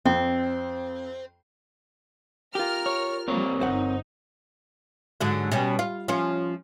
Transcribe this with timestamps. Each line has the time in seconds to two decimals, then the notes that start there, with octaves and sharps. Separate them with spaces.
0.05 F2 C4
2.55 F4 G4 A#4 F6
2.86 C#5
3.28 G3 A#3 C4 A#4 C#5
3.61 G1 D#4 C5 F#5
5.21 G#2 D3 F#3
5.51 B2 G3 C#4
5.79 F4
6.08 F3 C#4 F4